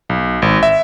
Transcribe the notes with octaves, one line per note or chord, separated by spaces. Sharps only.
B1
G#1
E5